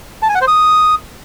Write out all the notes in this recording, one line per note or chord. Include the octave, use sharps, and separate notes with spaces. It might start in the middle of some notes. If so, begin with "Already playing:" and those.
A5
G#5
F#5
C5
D#6